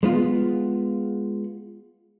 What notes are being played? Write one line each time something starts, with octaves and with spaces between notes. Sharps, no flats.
G#3 B3 F4